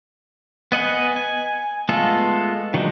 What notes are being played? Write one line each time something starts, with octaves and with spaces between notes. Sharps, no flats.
B3 D#5 F#5 G#5
G#5
G#3 A3 B3 F4 A4
D#3 F#3 G#3 D4 D#4